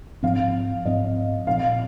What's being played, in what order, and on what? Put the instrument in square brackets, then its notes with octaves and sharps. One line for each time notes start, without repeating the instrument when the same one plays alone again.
[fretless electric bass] G#2 F3 C4 [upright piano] F5
[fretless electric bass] G#2 F3 C4 [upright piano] D#5
[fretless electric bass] A#2 F3 C4 [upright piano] F5